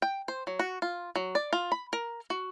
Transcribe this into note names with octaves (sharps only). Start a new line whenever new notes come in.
G5
C5
F#3
F#4
F4
F#3
D5
F4
B5
A#4
F#4